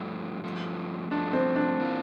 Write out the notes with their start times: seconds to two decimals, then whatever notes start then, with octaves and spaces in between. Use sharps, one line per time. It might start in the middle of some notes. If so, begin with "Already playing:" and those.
Already playing: G2 F3 A3
0.44 G2 F3 A3
1.11 G2 F3 A3 D4
1.33 C4
1.56 D4
1.80 E3 A#3 F4